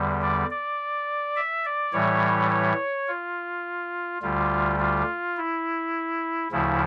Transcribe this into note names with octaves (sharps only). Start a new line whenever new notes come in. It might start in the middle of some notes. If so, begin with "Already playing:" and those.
Already playing: E2 D3 G3
D5
D5
E5
D5
A2 E3 G3 C#5
C#5
F4
D2 D3 G3 F4
F4
E4
D2 C#3 F3 E4